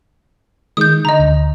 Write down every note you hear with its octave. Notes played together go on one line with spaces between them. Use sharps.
D#3 G#3 D#6 G6
D3 D#5 A#5
D2